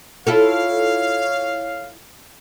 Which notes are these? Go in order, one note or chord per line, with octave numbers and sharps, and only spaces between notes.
E4 F4 A4 C#5 F5